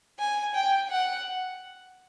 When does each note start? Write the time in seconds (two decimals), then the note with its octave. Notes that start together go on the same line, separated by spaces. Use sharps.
0.19 G#5
0.55 G5
0.91 F#5